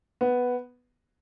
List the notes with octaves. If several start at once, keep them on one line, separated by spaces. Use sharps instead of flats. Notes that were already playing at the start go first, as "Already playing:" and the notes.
B3